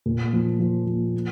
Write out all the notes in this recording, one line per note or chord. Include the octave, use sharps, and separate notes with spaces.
A#2
F3
F3
F3
A#3